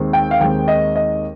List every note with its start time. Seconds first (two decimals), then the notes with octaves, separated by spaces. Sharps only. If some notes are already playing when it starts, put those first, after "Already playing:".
Already playing: D#2 D#3 G#3 C4
0.13 G5
0.31 F5
0.41 D#2 D#3 G#3 C4 G5
0.68 D#5
0.96 D#5